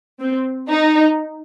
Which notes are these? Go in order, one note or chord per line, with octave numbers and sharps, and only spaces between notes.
C4
D#4